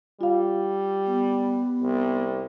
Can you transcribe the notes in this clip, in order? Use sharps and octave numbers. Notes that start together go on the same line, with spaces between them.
G3 F4 F5
B3
C2